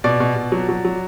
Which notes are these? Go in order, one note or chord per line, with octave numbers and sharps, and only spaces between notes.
B2 D5
B2
B2
F#3
F#3
F#3